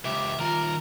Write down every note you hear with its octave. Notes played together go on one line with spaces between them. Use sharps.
C#2 G4 E5
D#3 F4 A#4